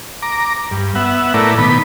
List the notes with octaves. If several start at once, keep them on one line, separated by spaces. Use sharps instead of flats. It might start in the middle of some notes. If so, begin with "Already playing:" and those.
A#5 D6
G2
B3 E5 F#5
A2 A3 E4 A#4 B4 D5
B2 D#3 B3 B5